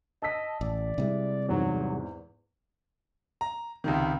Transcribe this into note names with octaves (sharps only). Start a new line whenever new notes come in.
D#5 A5 E6 B6
A1 D5
C3 G3 G#3 E4
E2 G#2 F#3
A#5
C#2 C3 D#3